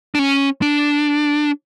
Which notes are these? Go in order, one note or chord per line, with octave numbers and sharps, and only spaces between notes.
D4
C#4
D4